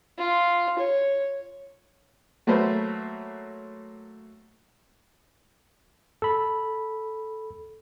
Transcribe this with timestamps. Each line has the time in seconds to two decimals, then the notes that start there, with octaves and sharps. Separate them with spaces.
0.18 F4
0.79 C#5
2.47 F#3 A3 A#3 B4 C5
6.22 A4 B5